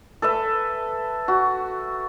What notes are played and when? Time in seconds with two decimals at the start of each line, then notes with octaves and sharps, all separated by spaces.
0.22 A4 B4 E5
1.28 F#4